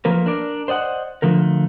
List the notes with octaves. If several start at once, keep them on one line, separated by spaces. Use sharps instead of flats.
F3 A3 A#3 A#4 B4
D4 A#4 D5
C5 D5 D#5 F#5
D3 F3 A3 A#4